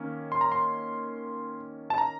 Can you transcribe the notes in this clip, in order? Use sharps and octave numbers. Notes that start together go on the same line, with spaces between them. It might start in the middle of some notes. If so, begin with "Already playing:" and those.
Already playing: D#3 A#3 C#4
C6
A#5
C6
A5
A#5